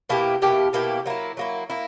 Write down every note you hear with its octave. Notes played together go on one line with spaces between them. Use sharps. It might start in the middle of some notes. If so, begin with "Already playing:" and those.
B2 A#3 E4 G4
B2 A#3 E4 G4
B2 A#3 E4 G4
F#3 A#3 E4
F#3 A#3 E4
A#3 E4